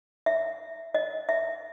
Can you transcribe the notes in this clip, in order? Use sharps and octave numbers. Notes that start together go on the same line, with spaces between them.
E5
D#5
E5